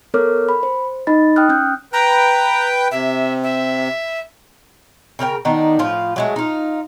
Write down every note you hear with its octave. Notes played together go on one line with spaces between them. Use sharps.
B3 A4 A#4 C#5 D6 F6
B5
C5
D#4 D#5 B5 A6
G5 D#6 F6 F#6
C#4 F#6 G6
B4 G5 A#5
C3 E5
E5
C#3 A#4 C5 G5
D#3 B3 D4 D#4
A2 F3 F4
F#3 G#3 A3
D#4 F4